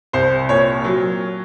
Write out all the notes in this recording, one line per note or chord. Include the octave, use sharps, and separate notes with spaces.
C2 C5
A#2 C#5
F#3